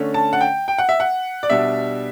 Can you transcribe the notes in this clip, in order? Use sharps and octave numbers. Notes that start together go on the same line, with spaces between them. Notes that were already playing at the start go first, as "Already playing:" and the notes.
Already playing: D3 A3 C#4
A5
F#5
G5
G5
F#5
E5
F#5
D5
B2 G3 D4 E5